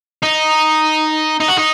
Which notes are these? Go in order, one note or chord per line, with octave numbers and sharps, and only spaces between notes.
D#4
D#4
F#4
D#4